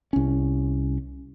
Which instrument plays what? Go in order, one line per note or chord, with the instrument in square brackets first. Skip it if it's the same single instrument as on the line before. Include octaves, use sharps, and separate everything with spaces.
[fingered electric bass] C2 C#4